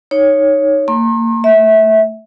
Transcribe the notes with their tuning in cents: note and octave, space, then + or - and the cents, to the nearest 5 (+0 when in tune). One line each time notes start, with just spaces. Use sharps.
D#4 +0 C#5 +0
A#3 -30 C6 +45
A3 +15 E5 -20